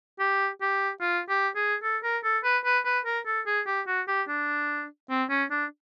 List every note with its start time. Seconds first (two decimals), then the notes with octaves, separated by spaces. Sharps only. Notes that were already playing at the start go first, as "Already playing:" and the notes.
0.20 G4
0.61 G4
1.01 F4
1.29 G4
1.56 G#4
1.83 A4
2.03 A#4
2.24 A4
2.44 B4
2.65 B4
2.85 B4
3.05 A#4
3.26 A4
3.46 G#4
3.67 G4
3.87 F#4
4.08 G4
4.28 D4
5.10 C4
5.30 C#4
5.51 D4